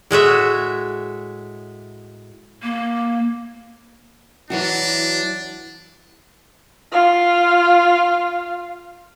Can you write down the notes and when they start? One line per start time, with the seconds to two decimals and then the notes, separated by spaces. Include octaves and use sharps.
0.11 A2 G#3 F#4 E5
2.63 A#3
4.50 E3 F#3 D4 F#4
6.92 F4 F5